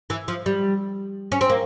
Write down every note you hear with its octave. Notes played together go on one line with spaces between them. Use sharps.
E3
F3
G3
C#4
C4
A#3